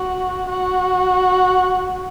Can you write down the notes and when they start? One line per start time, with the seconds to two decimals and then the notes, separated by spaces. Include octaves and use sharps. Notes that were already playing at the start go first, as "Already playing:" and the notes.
Already playing: F#4
0.49 F#4